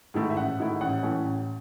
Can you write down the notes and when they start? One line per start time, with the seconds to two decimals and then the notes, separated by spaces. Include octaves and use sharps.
0.14 G#2 D#3 A3 E4
0.30 E5
0.36 A1 F#5
0.58 G#2 D#3 A3 E4
0.81 A1 F#5
1.03 A2 E3 A3 C#4
1.25 A1